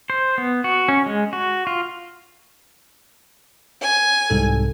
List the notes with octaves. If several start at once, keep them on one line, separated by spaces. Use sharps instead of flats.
C5
B3
F#4
C#4
G#3
F#4
F4
G#5
C2 G#2 A4